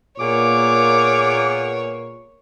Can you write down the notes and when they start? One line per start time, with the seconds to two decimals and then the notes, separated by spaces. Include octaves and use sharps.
0.19 A#2 A#3 B3 G#4 C#5 D6